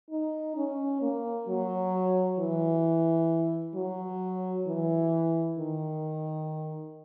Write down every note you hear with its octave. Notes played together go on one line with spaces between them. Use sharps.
D#4
C#4
A#3
F#3
E3
F#3
E3
D#3